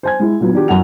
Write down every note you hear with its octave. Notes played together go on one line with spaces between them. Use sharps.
C5 G#5 G#6
G#3 E4
A#2 F#3 B3
D#3 F3 D4 D#4 F#4 G4
F#2 E3 F#5 F7